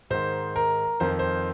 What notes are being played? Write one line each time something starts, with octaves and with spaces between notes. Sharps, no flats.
G#2 D#3 C5
A#4
F2 D#3 C5
C5